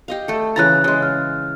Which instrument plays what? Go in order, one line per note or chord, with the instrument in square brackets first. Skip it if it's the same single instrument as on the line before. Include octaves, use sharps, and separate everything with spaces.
[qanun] G4 D#5 F5
A3 A4
[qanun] C#3 E3 A#5 [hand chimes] F#6 A6
[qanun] C#3 G#3
[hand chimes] F6